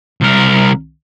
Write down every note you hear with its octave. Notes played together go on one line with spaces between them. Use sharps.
C2 A#4